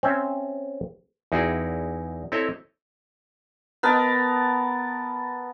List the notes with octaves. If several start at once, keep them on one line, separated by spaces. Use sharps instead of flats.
C4 C#4 E5
E2 D#4 E4 F#4 G#4 G5
C4 E4 A4 C#5 D#5 E5
B3 A#4 A5